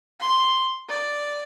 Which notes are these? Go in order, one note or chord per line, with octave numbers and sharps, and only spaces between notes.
C6
D5